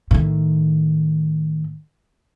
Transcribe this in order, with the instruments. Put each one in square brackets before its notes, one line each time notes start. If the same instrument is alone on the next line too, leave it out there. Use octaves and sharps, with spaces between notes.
[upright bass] A2 D#3